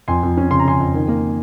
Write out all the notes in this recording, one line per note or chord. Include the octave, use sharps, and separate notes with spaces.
F2 G#5 C6
F2
C#4
C#3 C6
A#5
C#3 G#5 C6
F2
D#3
A#3